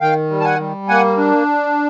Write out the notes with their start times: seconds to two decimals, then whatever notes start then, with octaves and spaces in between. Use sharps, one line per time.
0.01 D#3 F5 G5
0.30 G3
0.40 A5
0.44 F#5 G#5
0.60 G3
0.88 A#3 F#5 G#5
1.18 D4